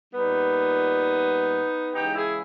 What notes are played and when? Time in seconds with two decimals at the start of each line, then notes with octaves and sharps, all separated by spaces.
0.14 A#2 G3 B3 D#4
1.93 C#3 E3 G#3 D#4 G4
2.15 E4 G#4